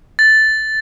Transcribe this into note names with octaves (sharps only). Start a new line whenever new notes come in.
A6